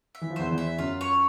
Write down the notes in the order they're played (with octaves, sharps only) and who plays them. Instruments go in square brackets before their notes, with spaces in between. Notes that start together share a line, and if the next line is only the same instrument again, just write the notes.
[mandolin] E5
[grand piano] E3
F3
[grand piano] E2 E3 [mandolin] C5
[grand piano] E2 E3
[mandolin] E5
[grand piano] F#2 F#3 [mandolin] F4
[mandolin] C#5